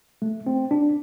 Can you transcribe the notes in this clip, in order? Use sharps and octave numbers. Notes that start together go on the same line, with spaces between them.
A3
C4
D4